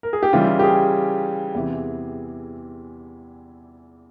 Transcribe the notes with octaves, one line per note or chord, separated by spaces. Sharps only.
A#4
G#4
G4
C#3 E3 G3 F4
G4
G#4
E2 C3 E3